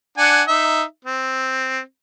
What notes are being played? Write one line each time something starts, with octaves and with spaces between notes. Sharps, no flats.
D4 F#5 G#5
D#4 E5
C4